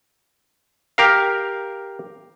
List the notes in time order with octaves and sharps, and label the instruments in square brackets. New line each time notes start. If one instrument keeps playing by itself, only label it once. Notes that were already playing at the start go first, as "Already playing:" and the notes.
[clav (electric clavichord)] G4 A#4 F5